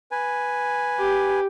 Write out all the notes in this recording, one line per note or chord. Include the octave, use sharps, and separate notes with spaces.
B4 G#5
G4